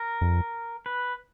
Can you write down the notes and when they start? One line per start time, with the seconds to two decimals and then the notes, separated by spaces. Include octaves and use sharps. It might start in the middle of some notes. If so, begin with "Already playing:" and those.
Already playing: A#4
0.21 F2
0.86 B4